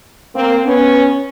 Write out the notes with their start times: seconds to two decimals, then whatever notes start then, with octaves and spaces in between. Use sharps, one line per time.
0.35 A#3 C4
0.65 B3 C#4